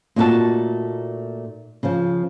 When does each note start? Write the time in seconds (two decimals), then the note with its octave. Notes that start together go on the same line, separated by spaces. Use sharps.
0.16 A#2 A3 D#4 F#4 G5 A5
1.83 C#3 F3